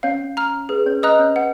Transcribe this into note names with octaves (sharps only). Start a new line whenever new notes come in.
C#4 C#5 F5
A#5 F6
G#4 B4
B4
C#4 C#5
B4 D#5 A#5 D#6 F#6
C#4 C#5
B4 F#5